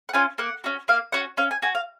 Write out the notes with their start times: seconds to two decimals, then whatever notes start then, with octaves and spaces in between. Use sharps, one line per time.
0.09 F#5
0.13 C#4 F4 G#5
0.38 A#3 F#5
0.64 C#4 F#4
0.88 A#3 F5
1.12 C#4 F#4 F#5
1.37 C#4 F5
1.51 G#5
1.62 F#4 G#5
1.75 F5